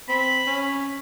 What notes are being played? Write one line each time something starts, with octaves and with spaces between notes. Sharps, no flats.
C4 B5
C#4